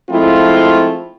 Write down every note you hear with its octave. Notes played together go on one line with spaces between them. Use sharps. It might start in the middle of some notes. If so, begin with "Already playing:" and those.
F3 G#3 A3 C4 E4 F4